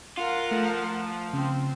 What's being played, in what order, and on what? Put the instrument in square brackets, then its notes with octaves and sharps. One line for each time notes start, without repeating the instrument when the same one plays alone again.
[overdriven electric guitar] F4 [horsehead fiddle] A#4 F#5
[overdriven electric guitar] F3 [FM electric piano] A3
[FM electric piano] C#3 [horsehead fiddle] C4